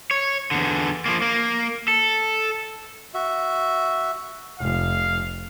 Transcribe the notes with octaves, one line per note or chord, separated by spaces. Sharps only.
C#5
E2 D3
F3 A#3
A#3
A4
F#4 E5
F1 F5